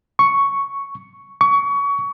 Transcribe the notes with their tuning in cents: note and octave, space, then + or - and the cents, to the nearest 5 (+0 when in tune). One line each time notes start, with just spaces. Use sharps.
C#6 +0
C#6 +25